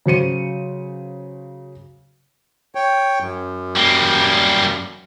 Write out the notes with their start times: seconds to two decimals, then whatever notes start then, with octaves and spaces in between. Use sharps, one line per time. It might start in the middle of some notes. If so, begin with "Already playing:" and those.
0.06 C#3 F#3 C5 C#7 D#7
2.75 C#5 G5
3.20 F#2
3.77 G3 A#3